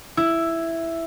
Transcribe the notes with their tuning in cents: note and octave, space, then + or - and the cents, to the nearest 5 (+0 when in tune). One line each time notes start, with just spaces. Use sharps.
E4 +5